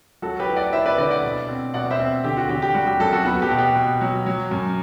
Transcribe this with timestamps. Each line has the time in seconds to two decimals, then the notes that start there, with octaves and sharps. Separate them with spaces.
0.22 F#3 F#4 A4
0.40 G4 B4
0.48 E4
0.56 D5 F#5
0.73 E4 C5 E5
0.86 B4 D5
0.98 D3 B4 D5
1.11 D5 F#5
1.23 B2
1.49 C4
1.74 B2 D5 F#5
1.90 C5 E5
1.99 C4
2.24 D3 G4
2.37 F#4
2.49 D3 G4
2.62 G4
2.74 G3 F#4
2.87 G4
3.00 F#2 F#4 A4
3.13 F#4 A4
3.25 B3 F#4
3.42 G4
3.51 B2
3.59 G4
3.75 B2
4.01 F#3
4.26 F#3
4.51 F#2